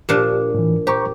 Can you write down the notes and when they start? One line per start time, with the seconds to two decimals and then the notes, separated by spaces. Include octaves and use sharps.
0.09 A#2 F3 D4 G4
0.54 A2 E3
0.87 G4 C5 A#5 C#6